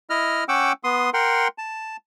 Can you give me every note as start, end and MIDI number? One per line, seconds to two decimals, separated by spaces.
0.10 0.44 64
0.10 0.44 75
0.10 0.44 89
0.49 0.72 61
0.49 0.72 78
0.49 0.72 79
0.49 0.72 86
0.49 0.72 88
0.84 1.10 59
0.84 1.10 84
0.84 1.10 87
1.14 1.48 70
1.14 1.48 78
1.14 1.48 79
1.14 1.48 84
1.58 1.97 81